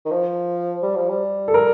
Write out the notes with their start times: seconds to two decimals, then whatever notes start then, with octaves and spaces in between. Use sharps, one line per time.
0.05 D#3
0.11 F3
0.83 G3
0.96 F3
1.10 G3
1.48 A4
1.54 A#4